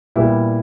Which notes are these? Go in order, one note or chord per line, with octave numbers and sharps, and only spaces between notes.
A#2 G3 B3 E4